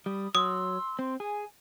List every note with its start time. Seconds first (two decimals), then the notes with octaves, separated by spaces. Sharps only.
0.06 G3 B5 D#6
0.35 F#3 C6 D#6 E6
0.99 C4 C6
1.20 G#4 G#5